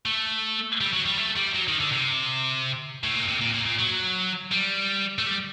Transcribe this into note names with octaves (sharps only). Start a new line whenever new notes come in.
A3
G3
F#3
G3
A3
G3
F#3
D#3
D3
C3
A2
A#2
C3
A#2
A#2
A#2
F#3
G3
A3
G3